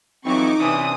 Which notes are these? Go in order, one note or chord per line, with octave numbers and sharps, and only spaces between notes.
F2 E3 F#3 C4 D#4 C#6 D6
C3 E3 C#4 D4 D#6